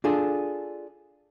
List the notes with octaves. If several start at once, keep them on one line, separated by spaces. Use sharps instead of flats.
D4 F4 G#4 A4